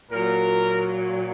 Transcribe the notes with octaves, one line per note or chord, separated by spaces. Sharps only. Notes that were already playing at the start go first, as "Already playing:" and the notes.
A#2 F#3 A#4